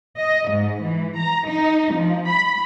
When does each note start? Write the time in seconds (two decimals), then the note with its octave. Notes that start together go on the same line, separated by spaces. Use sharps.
0.19 D#5
0.50 G#2
0.84 E3
1.18 A#5
1.49 D#4
1.95 F3
2.30 B5